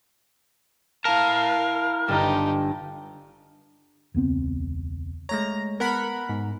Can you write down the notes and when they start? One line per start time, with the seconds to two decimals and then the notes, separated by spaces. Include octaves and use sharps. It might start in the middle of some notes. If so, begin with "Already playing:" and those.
1.05 E4 A#4 F5 A5
2.08 G1 D#4 G4 A4
4.14 E1 C#2 B3 C4
5.29 G#3 A3 C#5 A#5 A#6
5.80 B3 A#4 F#5 B5
6.29 G#2